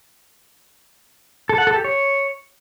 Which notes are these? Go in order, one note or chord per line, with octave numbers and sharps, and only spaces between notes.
A4
F#5
A4
G4
C#5